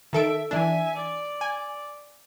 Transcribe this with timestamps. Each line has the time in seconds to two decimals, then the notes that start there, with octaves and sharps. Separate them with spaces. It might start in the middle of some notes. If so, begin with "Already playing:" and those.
0.13 D#3 A4 E5 D7
0.51 E3 D4 E5 G#5
0.95 D5
1.41 G#5